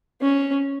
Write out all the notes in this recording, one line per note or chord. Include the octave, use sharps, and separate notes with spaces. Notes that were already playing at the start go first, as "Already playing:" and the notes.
C#4